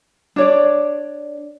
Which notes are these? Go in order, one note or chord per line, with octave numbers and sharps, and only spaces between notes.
D4 C#5 D5